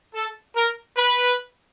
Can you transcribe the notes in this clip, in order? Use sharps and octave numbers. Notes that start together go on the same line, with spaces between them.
A4
A#4
B4